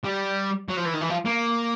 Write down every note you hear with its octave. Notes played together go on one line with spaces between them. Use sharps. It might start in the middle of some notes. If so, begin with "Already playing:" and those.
G3
F#3
F3
E3
D#3
E3
F3
A#3